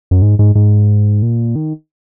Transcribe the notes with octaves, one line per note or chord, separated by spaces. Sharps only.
F#2
G#2
G#2
G#2
A#2
D#3